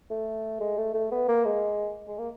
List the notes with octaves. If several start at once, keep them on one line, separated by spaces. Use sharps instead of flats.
A3
G#3
A3
A3
B3
A#3
G#3
G#3
A#3